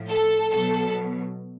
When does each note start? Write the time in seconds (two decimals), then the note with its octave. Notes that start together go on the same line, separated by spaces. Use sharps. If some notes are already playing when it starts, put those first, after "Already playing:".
Already playing: A2 F3
0.09 A4
0.51 B2 F#3 A4